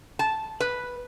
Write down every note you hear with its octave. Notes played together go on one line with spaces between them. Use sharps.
A5
B4